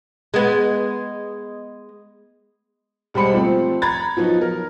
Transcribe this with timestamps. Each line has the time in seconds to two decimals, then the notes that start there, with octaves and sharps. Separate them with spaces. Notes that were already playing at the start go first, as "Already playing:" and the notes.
0.34 G#3 B3
3.14 E1 G3 G#3 C5 B5 C#7
3.33 F3 A3 C4
3.82 A#5 B5 G#6 A6
4.17 F3 F#3 B3 D#4
4.41 A#4